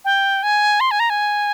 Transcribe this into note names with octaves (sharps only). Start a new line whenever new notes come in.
G5
G#5
C6
G#5
A#5
G#5